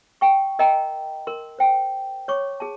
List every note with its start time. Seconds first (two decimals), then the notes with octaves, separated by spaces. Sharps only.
0.21 G5 C#6
0.59 A#4 D#5 G5 A#5
1.27 A#4 C6
1.59 C5 G5
2.28 C#5 C#6 D6
2.60 G#4 A5